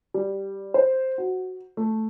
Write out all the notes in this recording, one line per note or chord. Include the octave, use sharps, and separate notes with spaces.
G3
C5
F#4
A3